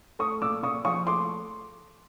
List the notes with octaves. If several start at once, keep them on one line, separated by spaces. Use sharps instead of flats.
A3 C#6 D#6
A#2 D6 E6
A#2 C#6 D#6
F3 C#6 D#6
A3 C6 D6